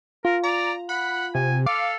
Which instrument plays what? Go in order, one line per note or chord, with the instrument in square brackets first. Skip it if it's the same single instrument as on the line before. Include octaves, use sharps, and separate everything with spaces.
[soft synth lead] F4 [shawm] A#4
[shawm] D5 [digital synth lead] A#5
[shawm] F#5 [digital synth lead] B5
[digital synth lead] C3 [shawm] G#5
[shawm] A4 [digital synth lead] F5 [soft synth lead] D6